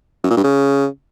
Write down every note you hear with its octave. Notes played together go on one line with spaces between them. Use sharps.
F#2
A#2
G2
C#3